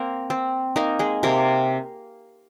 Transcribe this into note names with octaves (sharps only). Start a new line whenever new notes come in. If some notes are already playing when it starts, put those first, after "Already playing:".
Already playing: A#3 C4 A#4
C4
A#3 D#4 A#4
G#3 G#4
C3 A#3 A#4